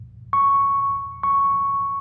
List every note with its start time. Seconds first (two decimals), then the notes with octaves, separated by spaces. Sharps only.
0.33 C#6
1.23 C#6